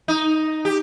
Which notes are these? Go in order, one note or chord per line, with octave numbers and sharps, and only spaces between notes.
D#4
G4